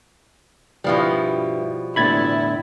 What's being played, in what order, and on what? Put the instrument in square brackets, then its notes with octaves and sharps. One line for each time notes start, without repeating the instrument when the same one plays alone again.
[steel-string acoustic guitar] G2 E4 [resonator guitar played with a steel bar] B2 F3 G3
[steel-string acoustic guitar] E2 A2 D3 [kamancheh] E4 [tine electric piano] B5 G#6 A6